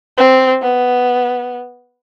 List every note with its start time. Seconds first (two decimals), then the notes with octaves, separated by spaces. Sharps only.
0.18 C4
0.62 B3